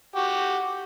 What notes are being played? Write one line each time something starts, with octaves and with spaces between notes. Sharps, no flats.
F#4 G4